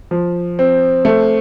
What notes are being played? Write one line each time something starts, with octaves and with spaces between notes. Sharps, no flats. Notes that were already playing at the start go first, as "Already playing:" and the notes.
F3
C4
A3